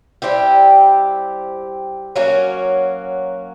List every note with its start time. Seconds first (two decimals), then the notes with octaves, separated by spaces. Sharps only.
0.22 G3 C4 E4 G4
2.16 F#3 A#3 C#4 F#4